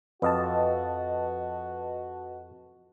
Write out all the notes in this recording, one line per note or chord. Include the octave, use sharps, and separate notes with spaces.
F2 F#4 B4 D#5 A5